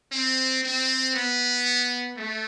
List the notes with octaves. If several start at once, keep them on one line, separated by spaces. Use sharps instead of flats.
C4
C4
B3
A3